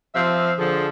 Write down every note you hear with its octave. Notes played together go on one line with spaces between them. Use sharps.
F3 C4 E5 F5
D3 F3 G#4 A4